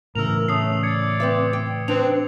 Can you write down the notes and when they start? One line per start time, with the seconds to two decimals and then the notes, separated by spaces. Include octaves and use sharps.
0.15 A2 C#3 E3 A#4 E6 F7
0.48 A3 C#4 D#6 C7
0.83 D5 E6 G#6 C#7
1.20 C4 B4 E5 D6
1.53 G5
1.88 C4 D4 B4 F7